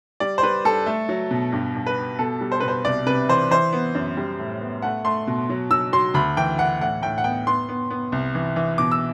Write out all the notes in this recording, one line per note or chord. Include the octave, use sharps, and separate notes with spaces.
G3 D5
C5
G3 B4
G3 A4
A3
F#3
B2
G2
G2
B4
B3
B2 A4
G3
C5
B2 B4
C5
C2 D5
C3 B4
E3 C5
E3 C5
B3
F#2
G3
A2
B3
A3 F#5
A3 C6
B2
F#3
F#3 E6
F#3 C6
D2 B5
E3 G5
E3 F#5
A2 F#5
A2 G5
F#5
B3 G5
B3 C6
B3
B3
C2
E3
E3
B2 D6
E6